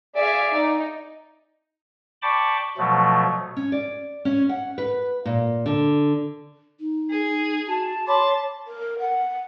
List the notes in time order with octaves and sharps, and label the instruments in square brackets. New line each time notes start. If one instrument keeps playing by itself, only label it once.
[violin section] G#4 E5 F5 [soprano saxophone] D5
[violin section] D#4
[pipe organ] D5 G5 A5 B5 C#6 D6
B2 F3 F#3 A3
[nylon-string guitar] C#4
D5
C#4
F#5
B4
A#2
D3
[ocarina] D#4
[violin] G#4
[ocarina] F#4 [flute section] A5
[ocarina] C#5 [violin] A5 [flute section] B5 C6 D6
[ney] A#4
F#5